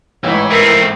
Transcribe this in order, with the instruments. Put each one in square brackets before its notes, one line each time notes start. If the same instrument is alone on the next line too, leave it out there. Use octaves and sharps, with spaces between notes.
[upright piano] A1 G#2 [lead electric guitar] E3 E4 [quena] C#5
[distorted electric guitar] A3 C4 [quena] A#4